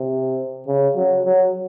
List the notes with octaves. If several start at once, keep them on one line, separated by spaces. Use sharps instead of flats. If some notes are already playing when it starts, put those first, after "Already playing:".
Already playing: C3
C#3
F#3
F#3